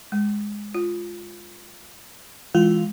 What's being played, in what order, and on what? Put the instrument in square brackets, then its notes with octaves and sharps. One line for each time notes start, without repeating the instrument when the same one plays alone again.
[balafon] G#3
F4
[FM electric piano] E3 F4 [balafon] G#3